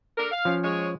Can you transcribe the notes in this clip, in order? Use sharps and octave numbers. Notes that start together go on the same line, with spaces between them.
D4 A4 A#4
F5
F3 C#4
G#3 C#5